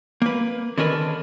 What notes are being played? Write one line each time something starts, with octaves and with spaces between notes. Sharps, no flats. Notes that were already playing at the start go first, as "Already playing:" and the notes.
A#3 B4
D3 D#3 C#4 D4 A#4 B4